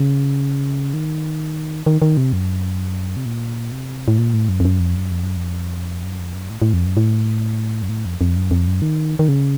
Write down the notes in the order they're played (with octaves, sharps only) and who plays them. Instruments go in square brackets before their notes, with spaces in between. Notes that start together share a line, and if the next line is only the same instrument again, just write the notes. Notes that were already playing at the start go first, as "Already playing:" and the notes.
Already playing: [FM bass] C#3
D#3
D#3
D#3
C3
F#2
C3
A#2
C3
A2
A#2
A2
F#2
F2
F#2
F2
F#2
F2
F#2
F2
F#2
F2
F#2
A2
A2
F2
F#2
A2
F#2
A2
F2
F2
F#2
F2
F#2
D#3
D#3
C#3